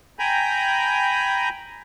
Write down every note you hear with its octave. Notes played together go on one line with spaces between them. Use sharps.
G5 G#5 A#5 B5